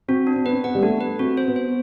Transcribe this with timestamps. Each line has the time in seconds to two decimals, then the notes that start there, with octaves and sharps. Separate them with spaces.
0.08 C4 F#4
0.27 D4
0.36 C4
0.44 B3 B4
0.52 C4
0.64 B3 F#5
0.75 G3
0.82 A3 D4
1.01 B4
1.19 C4 F#4
1.37 C5
1.47 B3
1.56 C5